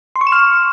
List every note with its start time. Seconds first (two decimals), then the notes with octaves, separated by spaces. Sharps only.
0.16 C6
0.21 C#6
0.27 E7
0.32 F6